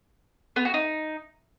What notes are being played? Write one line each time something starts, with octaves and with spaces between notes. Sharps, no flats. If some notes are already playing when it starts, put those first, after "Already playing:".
B3
F#4
D#4